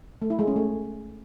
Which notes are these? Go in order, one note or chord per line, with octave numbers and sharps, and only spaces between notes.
A3
E4
G#3
C#4
A3